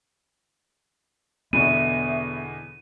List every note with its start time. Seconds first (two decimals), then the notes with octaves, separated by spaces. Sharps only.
1.53 E2 B2 D3 B3 E5 D#7